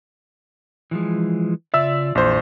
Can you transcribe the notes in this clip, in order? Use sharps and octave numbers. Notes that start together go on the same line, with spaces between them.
E3 F3 G#3
C#3 F4 D5 E5 E6
A#1 F2 E3 C5